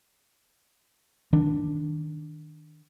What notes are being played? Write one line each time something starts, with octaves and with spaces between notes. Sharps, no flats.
D#3 D4